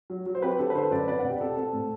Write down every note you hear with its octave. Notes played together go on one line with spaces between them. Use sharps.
F#3
F#3
C5
C4 G4 B4
D3 A4
B4
D3 A4 C5
F#2 B4 D5
C4 B4 D5
D5 F#5
B2
G4
C4 A4
C4 A4
A2